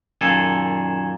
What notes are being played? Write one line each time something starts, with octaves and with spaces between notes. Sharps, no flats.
F#2 A#2 D#3 G#4 A4